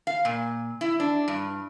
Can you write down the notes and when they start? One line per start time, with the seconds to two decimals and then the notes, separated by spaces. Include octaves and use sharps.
0.07 F5
0.25 A#2
0.81 E4
1.00 D4
1.28 G2